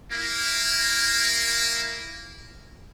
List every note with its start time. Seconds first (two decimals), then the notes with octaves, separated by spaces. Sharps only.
0.11 A#3 E4